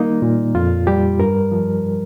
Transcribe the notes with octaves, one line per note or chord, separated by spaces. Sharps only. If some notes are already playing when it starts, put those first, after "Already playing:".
Already playing: D#3 G3 A#3 D#4
A#2
F2 F4
G3 G4
G2 A#4
F3